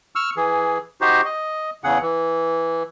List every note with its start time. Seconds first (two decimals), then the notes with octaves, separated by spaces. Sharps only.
0.16 C#6 E6 F6
0.37 E3 G#4
1.01 D#4 F#4 G4 C5
1.25 D#5
1.84 E2 C#3 G#4 F#5
2.02 E3